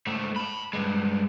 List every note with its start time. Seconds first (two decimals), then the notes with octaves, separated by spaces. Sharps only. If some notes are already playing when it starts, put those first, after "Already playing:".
0.07 G#2 A3
0.36 A5 B5
0.73 G2 G#3